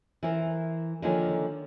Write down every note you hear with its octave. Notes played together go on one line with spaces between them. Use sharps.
E3 A#4 C5
D3 D#3 F3 A#3 C#5 G#5